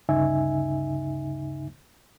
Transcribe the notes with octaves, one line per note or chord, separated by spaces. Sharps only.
D2 G2 C#3 D#4 E5 G#5